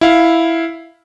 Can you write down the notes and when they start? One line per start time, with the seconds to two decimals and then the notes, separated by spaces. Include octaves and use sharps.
0.01 E4 F5